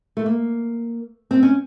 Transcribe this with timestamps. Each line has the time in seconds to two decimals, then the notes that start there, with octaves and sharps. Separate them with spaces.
0.17 A3
0.26 A#3
1.31 C4
1.43 C#4